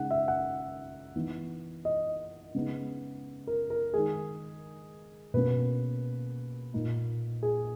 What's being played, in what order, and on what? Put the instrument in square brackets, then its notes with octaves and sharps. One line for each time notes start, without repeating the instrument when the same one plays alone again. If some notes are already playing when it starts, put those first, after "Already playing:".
Already playing: [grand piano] C#3 G#3 D#4 F#5
E5
F#5
E3 B3 D#4
D#5
C#3 G#3 B3 D#4
A#4
A#4
D#3 G#3 D#4 G#4
B2 A#3 C#4 B4
A#2 A#3 D#4
G#4